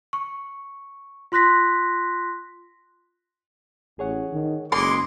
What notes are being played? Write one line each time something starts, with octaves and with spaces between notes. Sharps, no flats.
C#6
F4 C6 F#6 A#6 B6
A1 G#4 C#5 F#5
D#3
F#1 G#3 C6 D6